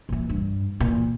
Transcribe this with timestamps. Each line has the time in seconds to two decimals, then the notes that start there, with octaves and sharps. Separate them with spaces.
0.09 A#2 E3
0.30 G2
0.80 E2 A#2